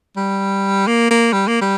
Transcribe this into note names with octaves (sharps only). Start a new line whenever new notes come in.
G3
A#3
A#3
G3
A#3
G3